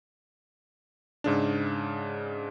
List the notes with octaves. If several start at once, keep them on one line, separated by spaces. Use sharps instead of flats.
G#2 C#3 D4